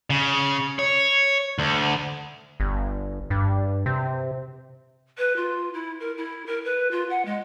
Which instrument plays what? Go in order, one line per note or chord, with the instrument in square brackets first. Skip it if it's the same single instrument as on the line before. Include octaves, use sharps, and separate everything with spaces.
[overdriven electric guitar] C#3
C#5
D2
[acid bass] G1
G2
C3
[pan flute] B4
F4
E4
A#4
E4
A#4
B4
F4
F#5
G#3